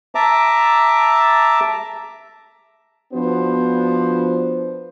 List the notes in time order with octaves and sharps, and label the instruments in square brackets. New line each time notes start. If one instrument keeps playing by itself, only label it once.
[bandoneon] E5 A5 A#5 D6
[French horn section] F3 B3 D4 F#4 C5